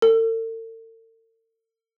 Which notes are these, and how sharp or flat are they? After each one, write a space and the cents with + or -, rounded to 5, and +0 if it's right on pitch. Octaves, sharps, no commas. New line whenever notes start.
A4 +45